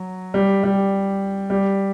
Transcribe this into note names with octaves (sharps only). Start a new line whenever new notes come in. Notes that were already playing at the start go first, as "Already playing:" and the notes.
Already playing: F#3
G3
G3
G3